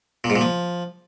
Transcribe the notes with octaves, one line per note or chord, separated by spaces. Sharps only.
A#2
G#2
A#2
F3